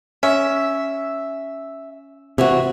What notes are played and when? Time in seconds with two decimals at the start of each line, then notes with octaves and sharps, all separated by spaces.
0.23 C#4 E5
2.38 C3 E3 C4 F#4